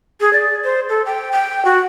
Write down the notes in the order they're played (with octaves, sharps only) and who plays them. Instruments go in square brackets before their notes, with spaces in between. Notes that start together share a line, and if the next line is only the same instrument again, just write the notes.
[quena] G#4
D5
C5
A4
G5
G5
F#4